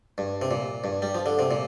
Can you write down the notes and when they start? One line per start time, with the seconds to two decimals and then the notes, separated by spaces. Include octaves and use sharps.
0.18 G2
0.42 C3
0.51 A#2
0.84 G2
1.02 G3
1.15 F3
1.26 D3
1.39 C3
1.51 A#2